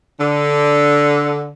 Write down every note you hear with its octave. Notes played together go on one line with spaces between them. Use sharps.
D3